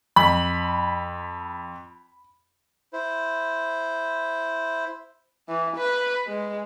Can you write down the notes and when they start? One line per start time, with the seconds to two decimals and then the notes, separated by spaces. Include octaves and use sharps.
0.16 F2 B5
2.93 E4 C5
5.48 E3
5.77 B4
6.27 G#3